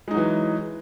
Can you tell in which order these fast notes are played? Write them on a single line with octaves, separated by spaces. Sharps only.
G#3 D#4 F#3 E3